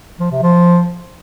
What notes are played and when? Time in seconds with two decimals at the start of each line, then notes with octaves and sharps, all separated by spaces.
0.20 F3
0.31 C3
0.43 F3